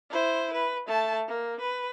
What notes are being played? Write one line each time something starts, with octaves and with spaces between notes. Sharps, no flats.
E4 C5
B4
A3 A5
A#3
B4